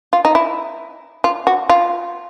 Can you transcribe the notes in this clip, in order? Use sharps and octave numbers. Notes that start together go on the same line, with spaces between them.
F4
D#4
E4
F4
F#4
F4